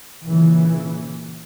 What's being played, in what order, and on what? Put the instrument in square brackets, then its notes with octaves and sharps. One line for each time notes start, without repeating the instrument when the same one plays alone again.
[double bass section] A#2 C#3 E3